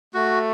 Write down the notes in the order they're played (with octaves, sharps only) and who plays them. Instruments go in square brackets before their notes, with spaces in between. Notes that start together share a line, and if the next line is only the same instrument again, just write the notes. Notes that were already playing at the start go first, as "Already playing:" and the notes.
[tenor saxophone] A3 [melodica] F#4